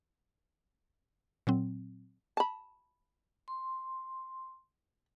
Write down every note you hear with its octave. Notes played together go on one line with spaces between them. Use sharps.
A#2 F#3 C4
A5 B5
C6